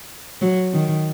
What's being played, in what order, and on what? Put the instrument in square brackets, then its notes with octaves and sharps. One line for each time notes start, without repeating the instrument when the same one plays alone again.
[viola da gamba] F#3
D#3